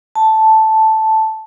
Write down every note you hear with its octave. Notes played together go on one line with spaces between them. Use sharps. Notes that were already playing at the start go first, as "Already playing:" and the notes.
A5